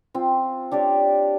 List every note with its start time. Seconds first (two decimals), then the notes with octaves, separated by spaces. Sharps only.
0.14 C4 F4
0.71 D4 G4 C#5 D5